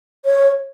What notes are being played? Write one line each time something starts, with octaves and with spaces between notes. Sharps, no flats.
C#5